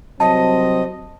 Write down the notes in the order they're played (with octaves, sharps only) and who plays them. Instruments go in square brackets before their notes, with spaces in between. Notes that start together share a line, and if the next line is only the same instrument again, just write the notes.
[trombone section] C2 F#3 [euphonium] C4 [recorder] D#5 [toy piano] A5